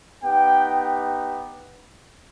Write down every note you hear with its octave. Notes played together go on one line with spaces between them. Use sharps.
B3 D#4 G4 G5